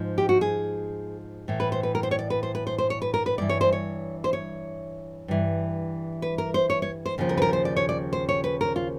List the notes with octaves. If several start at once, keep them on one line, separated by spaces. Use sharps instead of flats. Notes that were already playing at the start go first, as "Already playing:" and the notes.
Already playing: G#2 F3
G4
F#4
G#4
A2 E3
B4
C5
B4
A#4
C5
C#5
D5
B4
C5
B4
C5
C5
C#5
B4
A#4
B4
G2 E3 D5
C#5
C5
C#5
C5
C#5
G2 E3
B4
A#4
C5
C#5
C#5
C5
D#2 C#3 F3
A#4
B4
A#4
C5
D5
C#5
D5
C5
C#5
B4
A#4
F4